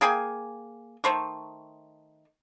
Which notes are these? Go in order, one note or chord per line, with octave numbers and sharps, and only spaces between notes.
A#3 G#4 G5 G#5
D#3 A3 C5 C#6